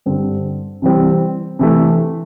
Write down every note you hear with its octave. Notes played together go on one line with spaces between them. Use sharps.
G2 D3 G3 C4
C3 E3 G3 C4
C3 E3 A3